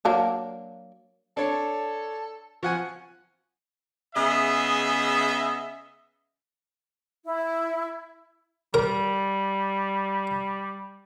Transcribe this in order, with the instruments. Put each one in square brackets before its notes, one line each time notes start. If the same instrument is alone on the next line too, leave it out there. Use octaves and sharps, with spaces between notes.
[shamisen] F#3 A#3 D4
[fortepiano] D4 C#5 [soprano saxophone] A4
[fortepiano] F3 F#5 G#5 [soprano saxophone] C#6
[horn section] C#3 B3 G#4 D#5 E5
[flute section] E4
[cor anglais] G3 [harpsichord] A#4